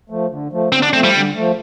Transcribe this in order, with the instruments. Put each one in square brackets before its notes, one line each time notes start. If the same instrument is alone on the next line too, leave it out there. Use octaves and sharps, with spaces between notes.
[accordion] F3 A3
D3
F3 A3
[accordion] D3 [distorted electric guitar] C4
[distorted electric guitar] D4
[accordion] A3 [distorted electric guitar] C4
[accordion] F3
[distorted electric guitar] G3
[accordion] D3
F3 A3